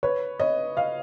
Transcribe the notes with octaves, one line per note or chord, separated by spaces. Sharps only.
B4 C#5
C#5 D#5
D#5 F5